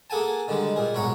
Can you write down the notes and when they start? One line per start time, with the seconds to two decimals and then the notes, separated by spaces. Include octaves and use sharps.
0.10 A#3 G#4 A4 F#5 G#5 A5
0.48 D3 D#3 G3 G#3
0.76 A#2 G#4
0.95 B1 G#2 C#5 F#5 A#5